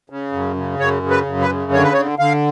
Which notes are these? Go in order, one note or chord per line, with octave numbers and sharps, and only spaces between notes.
C#3
F#2
C#3
F#2 C#5
C#3
B4
F#2
B4
C#3
D3 C#5
B4
D3 C#5
D3 F5